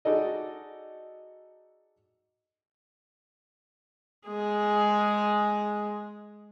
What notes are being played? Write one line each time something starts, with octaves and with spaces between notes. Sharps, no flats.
D#4 F#4 G#4 A4 D5 D#5
G#3 G#4